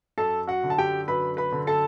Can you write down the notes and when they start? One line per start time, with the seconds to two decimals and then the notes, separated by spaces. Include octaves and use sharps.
0.18 F#2 A4 A5
0.47 F#4 F#5
0.64 D3
0.70 A5
0.78 G4 G5
1.08 F#2 B4 B5
1.37 B4 B5
1.52 D3
1.67 A4 A5